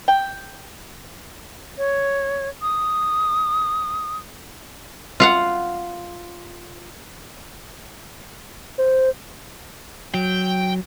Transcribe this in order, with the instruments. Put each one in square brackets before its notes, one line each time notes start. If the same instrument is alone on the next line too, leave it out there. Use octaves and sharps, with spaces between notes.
[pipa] G5
[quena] C#5
D#6
[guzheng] F4 F5 F#5
[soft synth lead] C5
[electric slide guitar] F#3 [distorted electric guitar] G5